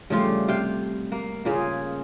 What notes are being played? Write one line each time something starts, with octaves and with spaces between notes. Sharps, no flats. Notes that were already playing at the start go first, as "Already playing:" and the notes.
C#3 F3 G3 A3 F4 G4
C3 F5 G5
A#3
C#3 A#3 C#4 F4 G#4